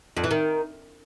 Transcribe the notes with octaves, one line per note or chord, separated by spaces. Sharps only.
F2
E3
D#3